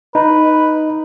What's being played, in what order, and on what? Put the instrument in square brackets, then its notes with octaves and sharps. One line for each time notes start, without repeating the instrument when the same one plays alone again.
[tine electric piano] D#4 [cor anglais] B4